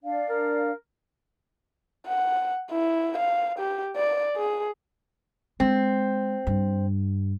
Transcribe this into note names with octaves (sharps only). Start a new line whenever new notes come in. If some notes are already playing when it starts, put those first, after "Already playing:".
D4 D5 F5
A#4
F#5
E4
F5
G4
D5
G#4
G#3 C4
G2